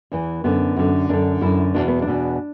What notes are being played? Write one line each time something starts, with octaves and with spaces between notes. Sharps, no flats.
E2 E3
F#2 D3 B3
F#2 D3
F#2 D3 D4
F#2 D3 E4
E2 B2 D4
B3
D4
E2 B2